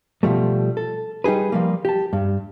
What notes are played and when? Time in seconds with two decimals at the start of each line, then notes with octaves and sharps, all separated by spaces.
0.23 B2 F3 G3 A3
0.77 A4
1.24 G3 D#4 G4 G#4 B4
1.52 F3 G3 A#3
1.85 G4 A5
2.13 G2